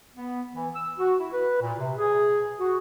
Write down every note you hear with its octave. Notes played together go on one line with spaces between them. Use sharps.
B3
E3
E6
F#4
E4
B4
A#2
C3
G#4
F#4